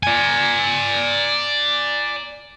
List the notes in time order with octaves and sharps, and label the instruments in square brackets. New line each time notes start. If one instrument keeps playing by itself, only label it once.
[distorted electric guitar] D5 G#5